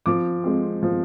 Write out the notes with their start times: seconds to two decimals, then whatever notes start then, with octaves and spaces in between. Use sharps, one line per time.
0.06 F3 D6
0.44 G#3 C4
0.83 F3